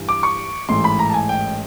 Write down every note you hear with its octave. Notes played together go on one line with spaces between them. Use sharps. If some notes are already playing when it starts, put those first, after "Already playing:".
Already playing: G2 E3 G3
D6
C#6
A1 G#2 E3 A3 C6
B5
A#5
A5
G#5
G5